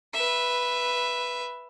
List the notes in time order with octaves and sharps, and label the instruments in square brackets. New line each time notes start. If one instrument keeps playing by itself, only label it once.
[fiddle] B4 E5